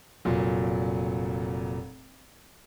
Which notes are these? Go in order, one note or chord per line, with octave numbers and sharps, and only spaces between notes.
F1 A#2 F#3